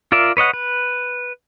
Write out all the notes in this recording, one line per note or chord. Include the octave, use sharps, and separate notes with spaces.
F4 A#4 D5 E5
B4 C#5 D#5 F#5
B4